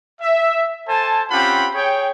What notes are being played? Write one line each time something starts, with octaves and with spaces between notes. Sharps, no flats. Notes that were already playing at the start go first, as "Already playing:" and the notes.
E5
A4 C5 G#5 A5
C4 C#4 F4 G4 F#5 B5
G#4 C#5 G5